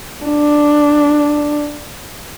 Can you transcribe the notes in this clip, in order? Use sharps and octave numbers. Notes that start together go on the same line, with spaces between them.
D4